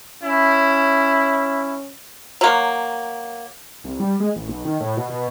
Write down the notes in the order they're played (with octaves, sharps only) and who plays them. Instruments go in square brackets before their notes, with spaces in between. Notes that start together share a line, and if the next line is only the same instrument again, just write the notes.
[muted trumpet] C#4 [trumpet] E4
[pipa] F#3 A#3
[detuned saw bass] C2
G3
G#3
A1
B1
D#3
A2
B2
B2